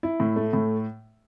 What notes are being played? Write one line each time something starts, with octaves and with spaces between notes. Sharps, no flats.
E4
A2
A3
A2